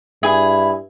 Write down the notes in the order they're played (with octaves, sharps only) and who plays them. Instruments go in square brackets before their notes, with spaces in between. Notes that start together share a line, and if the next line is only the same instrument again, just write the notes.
[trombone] G2 [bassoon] E4 [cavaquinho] G#4